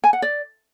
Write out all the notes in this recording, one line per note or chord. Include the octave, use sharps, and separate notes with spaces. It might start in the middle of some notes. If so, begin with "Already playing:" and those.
G#5
F#5
D5